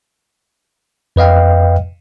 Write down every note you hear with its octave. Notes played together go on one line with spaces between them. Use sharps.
F2 B4 D#5 F5 G5